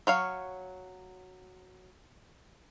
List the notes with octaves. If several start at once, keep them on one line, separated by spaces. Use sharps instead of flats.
F#3 C#5 F5